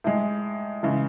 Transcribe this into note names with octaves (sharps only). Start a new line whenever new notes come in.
A2 G#3
C#3 E3 G#3